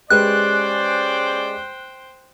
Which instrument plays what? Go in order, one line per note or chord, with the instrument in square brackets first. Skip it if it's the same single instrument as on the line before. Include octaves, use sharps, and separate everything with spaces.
[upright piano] G#3 G4 B4 [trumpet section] C#4 D5 [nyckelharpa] C5 G5 [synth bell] F#6